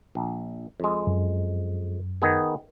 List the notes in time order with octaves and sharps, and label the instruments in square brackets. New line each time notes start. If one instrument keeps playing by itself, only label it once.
[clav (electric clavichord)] A#1
F2 G#3
[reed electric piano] F#2
[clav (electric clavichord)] D#3 B3 G#4